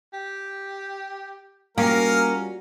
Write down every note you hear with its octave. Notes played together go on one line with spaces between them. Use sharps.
G4
G3 A#3 C#4 F4 F#4 A#4 F5